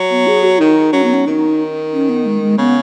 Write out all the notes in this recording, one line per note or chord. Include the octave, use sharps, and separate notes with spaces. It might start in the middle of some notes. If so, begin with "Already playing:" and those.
Already playing: F#3
B3
G#4
F#4
D#3 D#4
F#3 C#4
B3
C#4
D#3 D#4
C#4
B3
G#3
G#3
C#3 B3